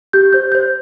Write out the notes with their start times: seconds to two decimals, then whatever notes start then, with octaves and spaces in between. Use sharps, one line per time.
0.13 G4 G6
0.33 C5 G6
0.52 C5 G6